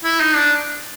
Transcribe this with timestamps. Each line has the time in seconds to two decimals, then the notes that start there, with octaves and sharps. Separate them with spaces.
0.04 E4
0.20 D#4
0.36 D4